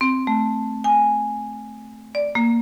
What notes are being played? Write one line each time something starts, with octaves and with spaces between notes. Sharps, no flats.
C4
A3
G#5
D5
A#3